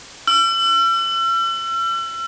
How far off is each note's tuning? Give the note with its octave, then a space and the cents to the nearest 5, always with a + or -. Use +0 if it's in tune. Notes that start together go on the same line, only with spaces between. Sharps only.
E6 +45